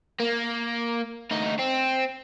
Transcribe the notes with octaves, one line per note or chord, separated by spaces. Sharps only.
A#3
D2 D#4
C4